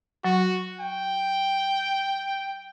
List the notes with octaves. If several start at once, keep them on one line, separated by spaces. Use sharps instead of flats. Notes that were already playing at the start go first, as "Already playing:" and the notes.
F#3 F#4
G5